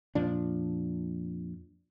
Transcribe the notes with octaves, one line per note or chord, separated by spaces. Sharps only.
F2 A#2 F3 D4